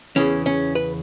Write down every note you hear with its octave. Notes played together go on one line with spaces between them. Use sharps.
E2 C#3 E3 C#4
C#4
B4